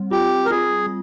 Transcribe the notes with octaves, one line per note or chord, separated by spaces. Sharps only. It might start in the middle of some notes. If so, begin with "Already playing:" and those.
Already playing: G3 C4
F4 G4
A#4
F4 G#4